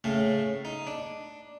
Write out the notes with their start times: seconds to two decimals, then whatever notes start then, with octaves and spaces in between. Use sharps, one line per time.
0.04 A2 C#3 A3
0.65 D#4
0.87 D4